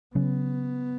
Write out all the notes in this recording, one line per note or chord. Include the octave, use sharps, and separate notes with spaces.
C#3 F#3 B3 C#4